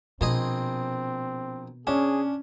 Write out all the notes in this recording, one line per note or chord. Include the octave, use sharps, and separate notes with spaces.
A#1 B2 C4 G#4 D#5
C#4 D4 G#4